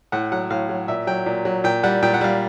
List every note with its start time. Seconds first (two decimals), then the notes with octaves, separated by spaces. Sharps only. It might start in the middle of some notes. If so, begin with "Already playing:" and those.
0.12 A2 F#5
0.32 F#3 F#5
0.50 A2 F5
0.69 F#3
0.88 A#2 E5
1.07 F#3 G5
1.26 A#2
1.45 F#3
1.64 A#2 G5
1.83 G3 F#5
2.03 A#2 G5
2.14 F#5
2.21 G3 F5